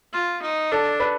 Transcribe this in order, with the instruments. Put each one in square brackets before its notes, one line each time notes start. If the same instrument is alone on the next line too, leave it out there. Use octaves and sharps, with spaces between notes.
[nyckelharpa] F4
D#4
[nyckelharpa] D4 [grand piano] A4
[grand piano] B4